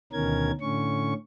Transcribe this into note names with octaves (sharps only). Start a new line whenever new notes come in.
D2 B2 D#3 C#4 A#4 G#6
A2 D3 C#4 C#6